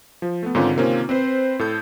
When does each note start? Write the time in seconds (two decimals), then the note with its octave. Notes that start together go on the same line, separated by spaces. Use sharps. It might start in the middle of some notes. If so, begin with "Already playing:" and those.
0.22 F3
0.43 A3 B3
0.55 G#2 D3 D#3 C4 C#4 F4
0.76 C3 D#3 A#3 C4 C#4 F4
1.09 C4 B4 C5
1.59 A2 A4 G6